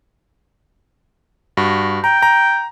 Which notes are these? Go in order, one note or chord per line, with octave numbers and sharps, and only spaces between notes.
G2 F#4
G5 A#5
A#5